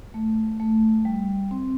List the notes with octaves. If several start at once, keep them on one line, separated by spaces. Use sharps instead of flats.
A3
A3
G3
C4